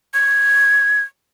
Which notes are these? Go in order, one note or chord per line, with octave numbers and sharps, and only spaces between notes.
G#6